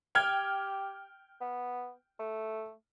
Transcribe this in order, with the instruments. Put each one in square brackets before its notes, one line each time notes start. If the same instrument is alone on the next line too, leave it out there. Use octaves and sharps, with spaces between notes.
[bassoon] G4 [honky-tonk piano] G5 F6 G#6
[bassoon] B3
A3